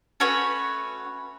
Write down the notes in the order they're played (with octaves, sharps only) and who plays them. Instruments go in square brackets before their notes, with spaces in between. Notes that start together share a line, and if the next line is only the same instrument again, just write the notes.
[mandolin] A3 C#4 F#4 B4 C#5